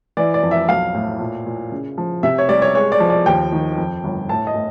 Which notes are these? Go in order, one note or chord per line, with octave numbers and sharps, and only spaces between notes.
E3 D5
D5
F2
E5
B1 F5
A2
A#2
A#2
C#3
F3
C3 E5
C#5
G3 D5
C#5
G#3 C#5
D5
F3
D5
D#2 G5
D#3
F2
G1
A2 A5
D#5
A2